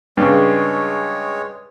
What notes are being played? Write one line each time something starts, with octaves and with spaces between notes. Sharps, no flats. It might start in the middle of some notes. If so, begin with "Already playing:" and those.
G2 C#3 G#3 C#5